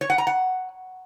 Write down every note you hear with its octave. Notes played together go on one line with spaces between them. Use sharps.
C#5
F#5
A#5
F#5